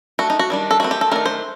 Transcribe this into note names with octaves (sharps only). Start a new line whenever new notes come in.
A3 D4 F#4
D#4
F#4
D#3 G3 D4
A4
D#3 A3 C4 F#4
G4
A4
D#3 A3 D4 A#4
C5